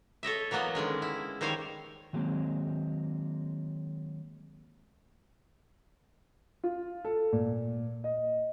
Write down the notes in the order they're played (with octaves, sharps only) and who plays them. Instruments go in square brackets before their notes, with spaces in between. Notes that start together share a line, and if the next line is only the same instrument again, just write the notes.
[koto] A4 C#5 D#5 E5
E3 F#3 A#3 B3 D#5
D3 D#3 G#3 C#4
E4
D#3 G3 C5 C#5 F5 G#5
[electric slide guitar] D#3 F#3 G#3 A#3 C4
[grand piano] F4
A4
A#2
D#5